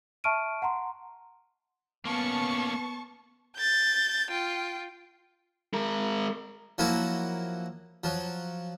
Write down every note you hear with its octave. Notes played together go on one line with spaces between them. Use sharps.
E5 A5 C#6 F6 D7 D#7
F#5 A#5 C6
A#3 B3 C#4 A5 C#6
G6 A6
F4 G5
G#3 A#4
F3 F#3 A#3 E4 F#4
F3 F#3